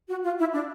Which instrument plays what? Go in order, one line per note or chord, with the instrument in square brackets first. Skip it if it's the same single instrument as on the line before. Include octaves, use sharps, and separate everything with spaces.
[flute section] F#4
F4
E4
D4